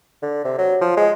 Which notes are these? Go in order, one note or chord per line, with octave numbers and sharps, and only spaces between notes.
D3
C3
F#3
F3
G#3